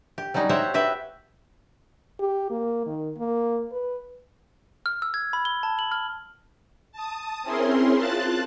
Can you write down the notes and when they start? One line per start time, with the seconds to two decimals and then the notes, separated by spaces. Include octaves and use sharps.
0.18 G4
0.34 F#3 G3 C#4 D#4
0.49 F#4 G4 C5 C#5 E5
0.74 F#4 G4 B4 E5
2.19 G4
2.50 A#3
2.86 D#3
3.18 A#3
3.72 B4
4.86 F6
5.02 E6
5.14 G#6
5.33 B5
5.45 G7
5.63 A5
5.79 F#7
5.92 F6
6.92 A5 D#6
7.43 C4 C#4 E4 G#4 A#4 C6
7.97 F4 A5 F#6 A6